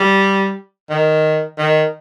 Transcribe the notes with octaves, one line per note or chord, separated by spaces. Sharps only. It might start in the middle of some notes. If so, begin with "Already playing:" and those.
Already playing: G3
D#3
D#3